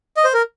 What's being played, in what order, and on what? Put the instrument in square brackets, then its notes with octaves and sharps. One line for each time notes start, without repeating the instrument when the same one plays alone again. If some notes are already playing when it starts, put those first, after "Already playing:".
[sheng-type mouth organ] D#5
C5
A#4